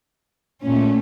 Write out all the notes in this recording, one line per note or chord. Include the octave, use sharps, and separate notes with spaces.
A#2 A3 C#4